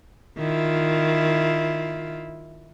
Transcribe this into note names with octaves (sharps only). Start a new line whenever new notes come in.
D#3 E4 F4